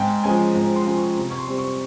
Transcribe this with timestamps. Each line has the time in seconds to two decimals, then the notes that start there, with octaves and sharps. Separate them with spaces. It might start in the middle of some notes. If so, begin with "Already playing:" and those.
Already playing: G#2 G5
0.24 F3 G#3 C#4 G#5
0.54 G#2 A#5
0.76 C6
0.86 F3 G#3 C#4
0.97 C#6
1.17 C3 A#5
1.31 C#6
1.38 C6
1.48 G3 C4
1.58 C#6